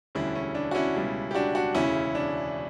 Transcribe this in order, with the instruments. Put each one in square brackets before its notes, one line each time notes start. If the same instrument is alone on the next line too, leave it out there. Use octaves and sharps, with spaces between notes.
[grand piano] E1 D2 D3 G3 C#4 E4
C#4
D4
F#4
C#4 E4
C#2 B2 G3
G4
D4 F#4
D4 F#4
E1 D2 C#3 C#4 E4
D4